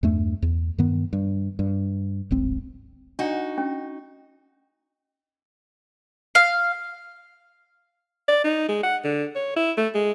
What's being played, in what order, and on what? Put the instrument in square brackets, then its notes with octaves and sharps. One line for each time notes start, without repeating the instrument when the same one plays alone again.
[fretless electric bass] E2 G2 A3
E2
G2 D#3 B3
G2
G2
D1 G#1 C4
[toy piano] D4 [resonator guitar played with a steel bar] D#4 F#4
[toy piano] C#4
[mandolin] F5
[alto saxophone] D5
D#4
G#3
F#5
D3
C#5
E4
A3
G#3